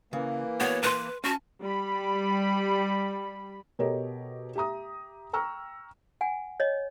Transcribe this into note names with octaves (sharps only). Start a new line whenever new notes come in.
C#3 E3 A#3
B3 F#4 C#5
B4 A5 C6
C#4 F#4 A5
G3 B5
B2 G4 A4 A#4 C#5 D#5
G4 E5 A#5 D#6
G5 A#5 C#6 E6 F6
F#5 G#5
C#5 D#5